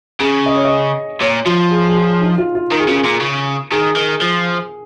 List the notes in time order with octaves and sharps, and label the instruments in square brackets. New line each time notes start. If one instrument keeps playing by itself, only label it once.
[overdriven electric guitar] C#3 [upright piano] G#4
[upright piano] D#5
C#5
D#5
[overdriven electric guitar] A#2 [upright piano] C#5
[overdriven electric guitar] F3 [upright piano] F4
[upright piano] G#4
G#4
F4
D#4
F4
F4
[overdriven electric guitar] D#3 [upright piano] A#4
[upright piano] G#4
[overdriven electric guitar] C#3 [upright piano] F4
[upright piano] G#4
[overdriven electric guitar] A#2
C#3
[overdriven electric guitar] D#3 [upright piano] G#4
[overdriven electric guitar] D#3
F3